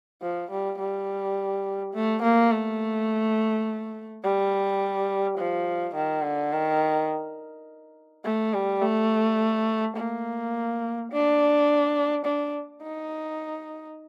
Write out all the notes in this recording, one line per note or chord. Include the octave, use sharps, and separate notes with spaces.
F3
G3
G3
A3
A#3
A3
G3
F3
D#3
D3
D#3
A3
G3
A3
A#3
D4
D4
D#4